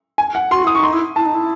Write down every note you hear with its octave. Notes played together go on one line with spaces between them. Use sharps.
G#5
F#5
F#4 C6
E4 D#6
C#6
D#4 C6
E4
E4 A5
D#4
E4